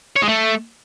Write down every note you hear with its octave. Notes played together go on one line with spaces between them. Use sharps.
C#5
G#3
A3